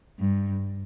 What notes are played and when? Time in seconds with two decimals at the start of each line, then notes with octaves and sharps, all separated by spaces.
0.19 G2